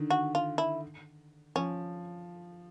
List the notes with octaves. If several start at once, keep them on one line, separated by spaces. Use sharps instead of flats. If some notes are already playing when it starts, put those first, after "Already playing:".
Already playing: D3 D#3
F#4
F4
E4
F3 C#4